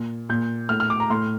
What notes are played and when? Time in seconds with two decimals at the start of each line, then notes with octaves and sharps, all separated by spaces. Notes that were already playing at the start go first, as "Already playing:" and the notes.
Already playing: A#2
0.29 A#2 G6
0.69 A2 F6
0.80 F6
0.90 D6
1.00 A#5
1.10 A2 C6